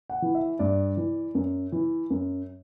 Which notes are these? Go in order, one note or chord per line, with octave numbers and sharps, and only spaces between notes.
F#5
E3
E5
G2 D5
E3
F#2
E3
F#2